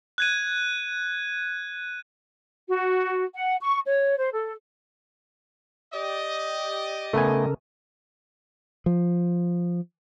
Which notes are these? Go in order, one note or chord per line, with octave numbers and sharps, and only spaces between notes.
F#6 G#6 D#7
F#4
F#5
C#6
C#5
C5
A4
G4 D5 D#5
C#3 A3 B3 A4 A#4 G#5
F3